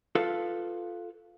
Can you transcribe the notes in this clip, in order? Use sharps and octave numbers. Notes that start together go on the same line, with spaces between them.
F4 A4 B4 F5